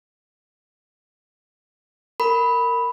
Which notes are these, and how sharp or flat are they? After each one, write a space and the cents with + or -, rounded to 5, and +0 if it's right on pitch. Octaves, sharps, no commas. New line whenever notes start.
A#4 -20 B5 +0